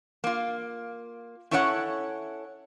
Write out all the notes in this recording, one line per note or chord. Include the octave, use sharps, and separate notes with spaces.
A#3 F4
C#4 E4 A4 C#5 D#5 F#5